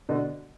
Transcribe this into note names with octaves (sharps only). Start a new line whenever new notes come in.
B2 D3